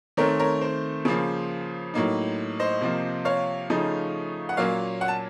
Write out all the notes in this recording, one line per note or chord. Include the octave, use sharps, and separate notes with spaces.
D#3 A3 C4 A#4 C#5
A#4 C#5
C5
C#3 F3 A#3
A2 F#3 A#3 D#4
C5 D#5
C3 F3 A#3
C#5 F5
C#3 F3 A3 D#4
F#5
A#2 F#3 A#3 C#4 C#5 F5
F#5
A5